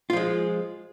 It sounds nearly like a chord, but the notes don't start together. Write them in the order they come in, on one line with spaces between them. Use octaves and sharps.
F4 F3 G#3